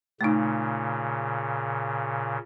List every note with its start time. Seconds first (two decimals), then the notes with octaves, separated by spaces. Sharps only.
0.21 A#2 C#3 A3 D#4